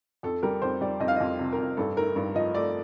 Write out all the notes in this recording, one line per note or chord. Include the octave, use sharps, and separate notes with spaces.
F2 A4
G3 A#4
F2 C5
G3 D5
F2 D#5
F5
F2 D#5
C3
A#4
F2
G2 A4
A3 A#4
G2
F3 D#5
A3 D5